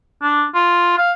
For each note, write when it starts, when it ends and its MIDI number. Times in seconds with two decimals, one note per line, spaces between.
0.22 0.45 62
0.55 0.94 65
0.98 1.12 77